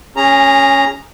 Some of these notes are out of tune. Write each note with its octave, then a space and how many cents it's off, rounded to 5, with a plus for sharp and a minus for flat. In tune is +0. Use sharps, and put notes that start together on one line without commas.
C#4 +0 G#4 -25 A#5 +0